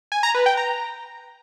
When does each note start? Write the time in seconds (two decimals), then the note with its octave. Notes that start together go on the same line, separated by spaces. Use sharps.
0.12 G#5
0.23 A#5
0.34 B4
0.46 G5
0.57 A#5